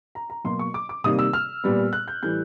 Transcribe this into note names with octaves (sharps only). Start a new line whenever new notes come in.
A#5
A#5
B2 F#3 A#3 C6
C#6
D6
D6
C3 D#3 G3 A#3 D#6
E6
F6
A#2 G3 B3
F#6
G6
A2 E3 G3 G6